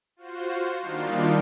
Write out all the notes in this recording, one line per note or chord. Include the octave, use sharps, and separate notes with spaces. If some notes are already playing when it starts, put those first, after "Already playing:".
F4 F#4 C5
D#3 G3 A#3 D4 D#4 F4